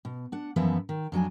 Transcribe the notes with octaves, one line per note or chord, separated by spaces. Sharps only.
B2
D4 F#5
F#2 E3 F3 B3 E5
D#3
F2 F#3 D4 G#5